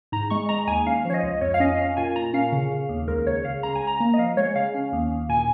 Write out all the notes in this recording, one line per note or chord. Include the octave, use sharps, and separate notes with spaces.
G#2 A#5
G#3 C#6
G#3 A#5
D#2 G#5
C#4 F5
F3 C#5
D#5
C#2
F2 C#5
F5
C#4 D#5
C#4 F5
A#2 G#5
A#2 A#5
C#4 F5
C#3
C#3
D#2
C#2 A#4
C#3 C#5
C#3 F5
C#2 A#5
G#5
C#2
A#5
A#3
D#5
F3 F5
G#3 C#5
C#3 F5
C#4
D#2
D#2
A#2 G#5